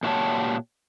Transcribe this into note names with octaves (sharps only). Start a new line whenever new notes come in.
A#2 D4 F#4 G4 C#5 A5